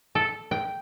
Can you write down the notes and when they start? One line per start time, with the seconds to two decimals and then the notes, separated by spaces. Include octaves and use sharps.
0.15 A4
0.51 G5